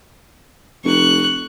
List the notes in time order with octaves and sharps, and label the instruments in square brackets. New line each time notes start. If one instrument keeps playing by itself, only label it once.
[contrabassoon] F1 [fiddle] C#6 F#6